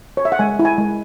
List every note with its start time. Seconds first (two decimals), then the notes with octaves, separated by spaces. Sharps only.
0.17 C#5
0.25 E5
0.32 F#5
0.39 G#3 G#5
0.59 E4
0.65 G#5
0.78 G#3